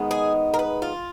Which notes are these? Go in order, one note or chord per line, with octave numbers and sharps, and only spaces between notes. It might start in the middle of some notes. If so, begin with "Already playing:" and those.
Already playing: D#3 G#3 B3
G#4
A#4
B4
F4